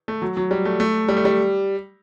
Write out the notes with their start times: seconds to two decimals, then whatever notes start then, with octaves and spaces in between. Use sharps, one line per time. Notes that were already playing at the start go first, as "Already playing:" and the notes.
0.08 A3
0.22 F#3
0.37 F#3
0.51 G3
0.65 A3
0.80 A3
1.08 G3
1.17 A3
1.25 G3